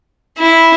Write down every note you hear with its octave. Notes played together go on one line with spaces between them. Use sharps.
E4